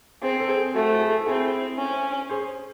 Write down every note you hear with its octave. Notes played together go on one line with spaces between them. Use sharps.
C4 G#4 C5
A4
G#4 C5
C5
A3 F#4 A4
F#4
E4 G#4
A4
C4 E4 G#4
C#4
G#4 C5